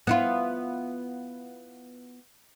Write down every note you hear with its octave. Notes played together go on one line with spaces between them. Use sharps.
B3 E4 F4